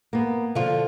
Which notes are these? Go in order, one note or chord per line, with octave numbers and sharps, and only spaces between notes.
A#3 B3
D3 F3 F4